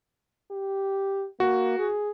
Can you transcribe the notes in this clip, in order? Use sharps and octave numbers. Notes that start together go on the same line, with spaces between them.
G4
A#3 F#4
G#4